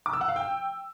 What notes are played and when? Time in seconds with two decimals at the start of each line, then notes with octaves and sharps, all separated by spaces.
0.06 D6
0.13 E6
0.21 F#5
0.28 F5
0.36 G5